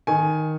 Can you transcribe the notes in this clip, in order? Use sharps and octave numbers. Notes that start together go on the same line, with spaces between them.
D#3 G#5